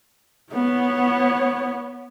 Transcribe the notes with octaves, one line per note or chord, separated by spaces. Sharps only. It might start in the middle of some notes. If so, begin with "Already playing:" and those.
B3 C#5